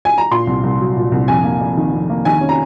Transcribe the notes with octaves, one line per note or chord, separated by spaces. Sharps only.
G#5
A#5
A#2 C6
C2
C2
F#3
A#2
C2
F2 G#5
A#3
F1
D#3
F2
A#3
D#3 G#5
C#4
A#5